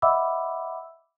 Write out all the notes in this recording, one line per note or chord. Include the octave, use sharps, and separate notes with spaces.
D#5 E5 F#5 B5 D6 E6